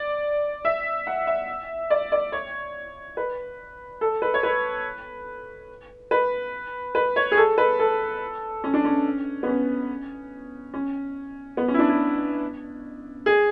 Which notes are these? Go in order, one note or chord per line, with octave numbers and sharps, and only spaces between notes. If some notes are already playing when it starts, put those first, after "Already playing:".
Already playing: D5
E5
F#5
E5
D5
D5
C#5
B4
A4
B4
C#5
B4
B4
B4
C#5
G#4
A4
B4
A4
C#4
D4
C#4
B3
C#4
C#4
B3
C#4
E4
D4
E4
G#4